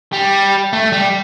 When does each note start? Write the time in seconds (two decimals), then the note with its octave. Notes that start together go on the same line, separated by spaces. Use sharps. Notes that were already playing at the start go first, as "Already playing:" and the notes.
0.13 G3
0.73 A3
0.92 G3